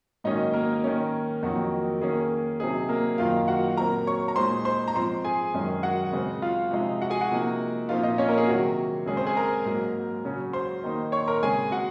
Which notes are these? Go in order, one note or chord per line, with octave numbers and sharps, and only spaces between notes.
G#2 D#3 F#3 A#3 C#4 D#4 D#5
A#3 A#4
D#3 A#3 C#4
F2 D#3 F#3 A#3 D#4 F#4
D#3 A#3 C#4 G#4
C3 F#3 C4 D#4 G#4
A#3 A#4
F#2 D#3 A#3 D#4 F4 F5
F#4 F#5
A#2 F#3 C4 A#4 A#5
C#5 C#6
A#5
A#2 G#3 D#4 C5 C6
C5 C6
A#5
G#2 F3 C4 C5 C6
G#4 G#5
F#2 D#3 G#3 C#4
F#4 F#5
C#3 G#3 C4
F4 F5
C3 F3 G#3 D#4
F#4 F#5
G#4 G#5
F#4 F#5
C3 F3 A#3 D#4
A#2 F3 C4 D#4 F4 F5
D#4 D#5
C#4 C#5
A#3 A#4
G#4
C3 D#3 F#3 F#4
C#3 G#3 C#4 G#4
C4 C5
G#4 G#5
A#4 A#5
G#2 F#3 A#3
C#3 F#3 C#4
C5 C6
D#3 A#3 D#4
C#5 C#6
A#4 A#5
C#3 G#3 C4 G#4 G#5
F#4 F#5